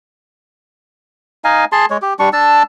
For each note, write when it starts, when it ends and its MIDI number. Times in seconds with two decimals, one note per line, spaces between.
1.44 1.65 63
1.44 1.65 75
1.44 1.65 77
1.44 1.65 80
1.72 1.86 68
1.72 1.86 81
1.72 1.86 84
1.90 1.97 56
1.90 1.97 73
2.02 2.14 67
2.19 2.29 55
2.19 2.29 62
2.19 2.29 85
2.33 2.63 62
2.33 2.63 81
2.33 2.63 88